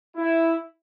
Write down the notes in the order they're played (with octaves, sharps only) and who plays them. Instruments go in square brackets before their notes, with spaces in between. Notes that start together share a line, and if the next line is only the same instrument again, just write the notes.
[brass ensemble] E4